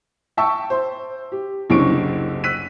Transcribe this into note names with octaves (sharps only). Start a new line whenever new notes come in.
E5 G5 A5 C#6 E6
C5
G4
F#1 C2 D3 C#4 C#6 D7
E6 F#6 B6 D#7